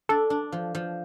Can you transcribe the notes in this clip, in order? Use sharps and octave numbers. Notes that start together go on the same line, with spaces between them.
D4 A4
D4
F3
F3